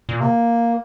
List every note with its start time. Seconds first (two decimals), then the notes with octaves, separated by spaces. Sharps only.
0.09 A#2
0.20 C3 A#3